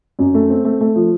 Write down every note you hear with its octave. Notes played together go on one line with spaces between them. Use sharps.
F#2
A3
C4
A3
A3
F3